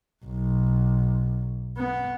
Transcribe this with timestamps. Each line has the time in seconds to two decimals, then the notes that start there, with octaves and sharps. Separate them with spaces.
0.25 B1
1.77 B3